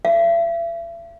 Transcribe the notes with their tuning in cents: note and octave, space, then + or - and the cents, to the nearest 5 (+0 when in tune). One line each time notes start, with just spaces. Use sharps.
E5 +40